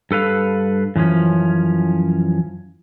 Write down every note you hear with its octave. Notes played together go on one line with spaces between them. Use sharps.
G2 A4 B4 F5
F#2 E3 F3 C#4